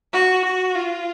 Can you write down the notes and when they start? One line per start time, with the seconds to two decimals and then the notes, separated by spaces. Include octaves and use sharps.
0.13 F#4
0.45 F#4
0.75 F4